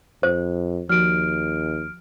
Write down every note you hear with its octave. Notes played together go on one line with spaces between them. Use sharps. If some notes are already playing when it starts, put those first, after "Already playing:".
F2 C5
D#2 F3 F#4 F6 D7